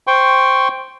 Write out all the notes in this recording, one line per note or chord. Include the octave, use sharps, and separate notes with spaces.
C5 G5 C6 C#6